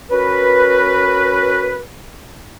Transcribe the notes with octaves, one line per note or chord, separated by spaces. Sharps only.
C#4 F#4 A#4 B4